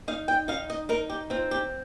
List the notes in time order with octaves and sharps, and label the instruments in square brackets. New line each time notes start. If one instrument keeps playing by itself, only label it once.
[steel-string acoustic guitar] D#4 F5
G5
D#4 F5
D#5
D#4 A#4
G4
C4 F4
G4